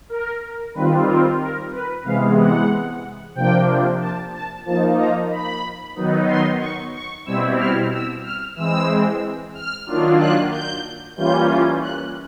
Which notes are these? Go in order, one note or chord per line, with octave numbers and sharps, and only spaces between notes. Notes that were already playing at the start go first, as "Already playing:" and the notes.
A#4
D#3 G3 C4 F4 B4
A#4
A#4
B4
C3 E3 G#3 B3 F5
F#5
C3 F3 A#3 D4 G5
A5
A5
F3 A#3 D#4 A5
A#5
B5
D#3 F#3 B3 D#4
C6
C#6
C#6
B2 G3 C4 E4 E6
F6
E6
F6
E3 G#3 C4 E6
F6
D#3 F#3 A#3 D4 F4
F#6
G6
E3 G3 A#3 C#4 F4 G6
F#6